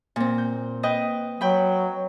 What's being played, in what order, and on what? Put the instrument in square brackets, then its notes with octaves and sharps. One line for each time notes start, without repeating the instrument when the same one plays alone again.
[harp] A#2 C4
G6
B4 D#5 G5
[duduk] F#3 [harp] G5 B5